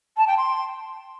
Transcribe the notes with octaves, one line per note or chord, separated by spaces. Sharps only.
A5
G5
C6